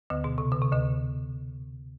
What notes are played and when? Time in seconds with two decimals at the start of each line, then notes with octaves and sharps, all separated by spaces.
0.10 D2 D3
0.24 B2
0.38 C3
0.52 D3
0.62 C3
0.72 D2 D3